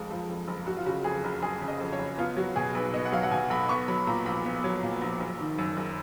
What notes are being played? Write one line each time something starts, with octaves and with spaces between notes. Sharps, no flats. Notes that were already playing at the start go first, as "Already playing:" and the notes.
Already playing: F#1 F2 F3 G#3
F3
F2
F#1
F#1 F#4
F4
C#3 F#4
F2 G#4
F#1
F#1 G#4
C#3
D#5
F2
C#5
F#1
B3 F4
F#3 F#4
B2 G#4
B1 B4
B3 D#5
F#5
F#3 F5
F#5
B2 G#5
B1 B5
B3 C#6
F#3 B5
A#2 A#5
A#1 B5
B3
F#3
A#2
A#1
F#1
D#3
F#2
F#1